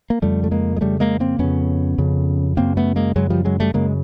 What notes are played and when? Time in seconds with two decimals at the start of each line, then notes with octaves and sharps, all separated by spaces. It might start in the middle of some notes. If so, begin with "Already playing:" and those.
0.10 A#3
0.22 F2 C#3 G3 A3
0.44 A3
0.51 G#3 A#3
0.76 G#3
0.81 F2 C#3 G3 A3
1.00 G#3 A#3
1.20 A#3 C4
1.39 F2 C#3 B3 C#4
1.98 F2 C#3
2.57 F#2 C#3 A#3 C4
2.77 A3 B3
2.96 G#3 A#3
3.16 F#2 C#3 F#3 G#3
3.30 F3 G3
3.45 F#3 G#3
3.60 G3 A3
3.74 F#2 C#3 G#3 A#3